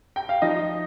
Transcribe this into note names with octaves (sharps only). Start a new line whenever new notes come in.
G5
F5
F3 D#4 D#5